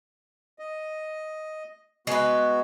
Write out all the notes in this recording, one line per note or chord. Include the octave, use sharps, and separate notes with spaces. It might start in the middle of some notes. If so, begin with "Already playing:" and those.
D#5
G#3 B3 F#4 B4